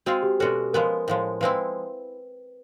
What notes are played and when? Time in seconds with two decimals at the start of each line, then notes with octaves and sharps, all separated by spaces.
0.06 G#3 C4 F4 F#4 G#4
0.23 G4
0.39 B2 G#3 C#4 F#4 A4
0.73 F3 G#3 B3 A#4
1.08 A2 F3 G#3
1.41 F3 G#3 C4 E4 B4